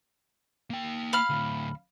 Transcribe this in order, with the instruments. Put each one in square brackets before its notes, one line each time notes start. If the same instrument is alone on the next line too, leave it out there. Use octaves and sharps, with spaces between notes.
[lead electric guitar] A#3 G5
[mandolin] F5 B5 F6
[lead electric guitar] D2 A2